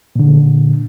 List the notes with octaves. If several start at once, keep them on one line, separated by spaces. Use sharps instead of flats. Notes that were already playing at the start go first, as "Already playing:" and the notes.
A#2 D3